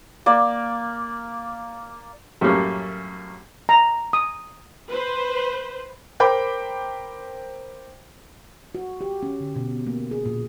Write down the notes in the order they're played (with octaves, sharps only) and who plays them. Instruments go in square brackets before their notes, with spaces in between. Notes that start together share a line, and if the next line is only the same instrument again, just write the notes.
[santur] A#3 D5
[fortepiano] F#2 A2 G3 A#3 C#4
[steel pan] A#5
D#6
[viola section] B4 C5
[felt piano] A#4 C5 G5 B5 D6
[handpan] F#4
G4
C#4
D3
B2
A#3
G#4
A#2